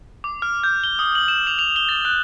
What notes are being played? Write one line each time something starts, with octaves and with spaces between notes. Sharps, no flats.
D6
F6
G6
G7
D#6
F#7
E7
F7
F7
G7
A6
F#6